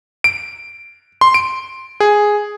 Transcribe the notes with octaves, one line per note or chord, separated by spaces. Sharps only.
D7
C6
D7
G#4